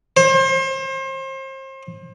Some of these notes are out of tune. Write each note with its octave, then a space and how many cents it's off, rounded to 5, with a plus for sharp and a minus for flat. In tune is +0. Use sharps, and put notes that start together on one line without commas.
C5 +35